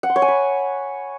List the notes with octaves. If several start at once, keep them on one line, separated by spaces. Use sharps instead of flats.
F#5
C6
C#5
G#5
B5